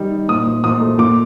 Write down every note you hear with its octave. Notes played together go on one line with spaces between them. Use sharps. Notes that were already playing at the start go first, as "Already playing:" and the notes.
Already playing: D#3 G3 D#4
D#4
A#2 D#6
A#2
A#2 D#6
A3
A#2 D6